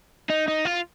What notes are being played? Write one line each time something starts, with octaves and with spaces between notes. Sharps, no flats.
D#4
D#4
F4